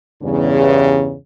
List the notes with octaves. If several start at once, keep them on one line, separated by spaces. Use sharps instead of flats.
E2 G2 C#3